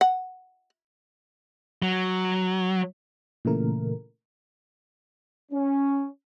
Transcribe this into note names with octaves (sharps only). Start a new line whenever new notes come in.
F#5
F#3
A#2 C#3 E3 A3 A#4
C#4